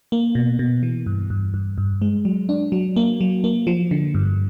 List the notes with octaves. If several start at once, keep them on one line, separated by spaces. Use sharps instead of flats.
A#3
B2
B2
E3
G2
G2
G2
G2
G#3
F#3
D4
F#3
A#3
F#3
A#3
F3
D3
G2